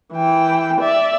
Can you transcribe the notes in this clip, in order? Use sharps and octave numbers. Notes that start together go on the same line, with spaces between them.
E3 G5
D5 E5